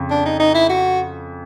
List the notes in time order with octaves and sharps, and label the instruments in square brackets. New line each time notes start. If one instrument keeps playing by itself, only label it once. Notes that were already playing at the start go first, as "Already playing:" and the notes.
Already playing: [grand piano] F2 C#3
[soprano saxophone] D4
D#4
D#4
E4
F#4